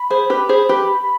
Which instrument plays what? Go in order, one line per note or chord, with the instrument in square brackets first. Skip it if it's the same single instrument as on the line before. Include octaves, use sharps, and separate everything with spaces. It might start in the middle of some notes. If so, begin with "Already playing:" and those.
Already playing: [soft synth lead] B5
[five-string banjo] G#4 C5
G4 B4
G#4 C5
G4 B4